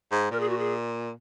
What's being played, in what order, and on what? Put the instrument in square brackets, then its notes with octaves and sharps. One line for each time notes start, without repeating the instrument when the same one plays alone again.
[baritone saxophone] G#2
[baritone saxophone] A#2 [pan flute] A#4
[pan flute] G#4
F#4
G#4